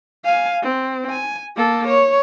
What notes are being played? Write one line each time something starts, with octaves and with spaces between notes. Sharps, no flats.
F5 G#5
C4
G#5
A#3 A4
C#5